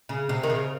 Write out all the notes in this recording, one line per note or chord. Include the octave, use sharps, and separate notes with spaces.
C#3
C3
D#3
C#3